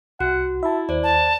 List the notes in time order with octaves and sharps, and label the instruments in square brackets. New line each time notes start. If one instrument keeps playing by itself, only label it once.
[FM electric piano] C2 [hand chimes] F#4 [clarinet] F#5
[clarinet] E4 [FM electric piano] E5 A5
[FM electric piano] D#2 [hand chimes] C5 D5
[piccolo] A5